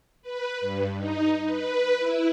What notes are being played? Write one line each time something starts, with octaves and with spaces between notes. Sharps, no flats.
B4
G2
D#4
B4
E4